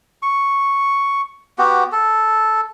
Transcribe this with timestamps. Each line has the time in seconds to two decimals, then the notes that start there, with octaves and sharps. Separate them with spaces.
0.22 C#6
1.58 B3 F#4 G4
1.92 A4